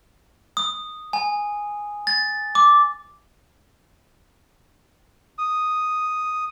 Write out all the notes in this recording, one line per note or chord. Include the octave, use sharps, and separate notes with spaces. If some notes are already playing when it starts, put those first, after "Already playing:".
D#6
G#5
A6
D6
D#6